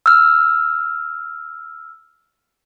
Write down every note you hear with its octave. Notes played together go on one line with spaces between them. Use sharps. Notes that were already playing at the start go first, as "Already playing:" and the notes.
E6 F6